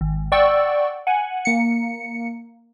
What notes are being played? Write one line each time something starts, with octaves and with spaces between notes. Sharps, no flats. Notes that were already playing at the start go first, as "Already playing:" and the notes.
G#1
D5 F#5 G5 C#6 E6
F#5 G#5
A#3 C#7